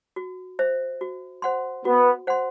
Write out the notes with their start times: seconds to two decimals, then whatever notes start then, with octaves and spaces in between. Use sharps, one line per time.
0.16 F#4
0.59 C5 E5
1.01 F#4
1.42 C5 F#5 C6
1.85 B3 F#4
2.27 C5 F#5 C6